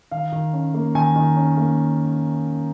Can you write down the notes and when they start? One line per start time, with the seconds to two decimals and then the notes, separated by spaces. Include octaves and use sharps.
0.11 D#3 F5
0.32 D#3
0.53 C#4
0.74 A#3
0.95 D#3 G#5
1.16 D#3
1.37 C#4
1.57 A#3